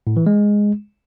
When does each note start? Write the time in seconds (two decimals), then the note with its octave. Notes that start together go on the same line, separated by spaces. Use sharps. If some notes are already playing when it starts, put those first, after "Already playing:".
0.07 A2
0.17 E3
0.27 G#3